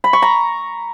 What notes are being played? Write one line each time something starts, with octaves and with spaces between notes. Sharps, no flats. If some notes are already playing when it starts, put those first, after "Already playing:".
B5
C#6
A#5